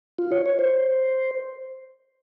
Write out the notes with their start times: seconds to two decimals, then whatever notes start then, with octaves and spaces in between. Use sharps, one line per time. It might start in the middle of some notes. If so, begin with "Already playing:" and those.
0.19 F4
0.32 C#5
0.46 C#5
0.59 C5